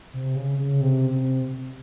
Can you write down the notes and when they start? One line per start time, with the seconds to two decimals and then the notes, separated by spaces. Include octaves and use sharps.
0.13 C3
0.35 C#3
0.58 C#3
0.81 C3
1.10 C3